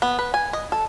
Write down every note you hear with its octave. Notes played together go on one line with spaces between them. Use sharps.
B3
B4
G#5
D#5
A4